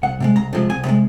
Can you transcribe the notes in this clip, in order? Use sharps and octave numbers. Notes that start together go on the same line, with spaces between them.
C2 F#5
C3 F3 G#3
C2 A#5
C3 F3 G#3
C2 G#5
C3 F3 G#3